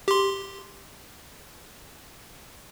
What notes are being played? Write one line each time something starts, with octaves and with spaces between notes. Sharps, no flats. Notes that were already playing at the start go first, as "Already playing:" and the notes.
G4 C6